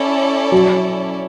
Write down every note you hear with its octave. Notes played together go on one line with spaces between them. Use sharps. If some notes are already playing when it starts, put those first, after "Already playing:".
Already playing: C#4 E4 A4 D5
F#3